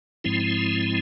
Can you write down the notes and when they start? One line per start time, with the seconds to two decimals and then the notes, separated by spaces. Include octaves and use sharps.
0.24 G#2 F3 G#3 C4 E4